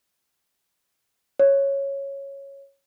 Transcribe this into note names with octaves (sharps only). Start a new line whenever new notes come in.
C#5